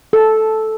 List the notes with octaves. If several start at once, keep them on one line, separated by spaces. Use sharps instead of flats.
A4